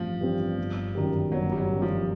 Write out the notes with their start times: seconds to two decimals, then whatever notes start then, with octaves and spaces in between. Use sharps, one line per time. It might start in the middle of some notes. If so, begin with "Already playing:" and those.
Already playing: A1 G2 E3 F3 G3 C4
0.21 G2 E3 G3 C4
0.58 G1
0.95 F#2 D#3 G3
1.32 G1 F#3
1.52 G3
1.58 F#3
1.69 F#2 D#3 G3
1.82 F3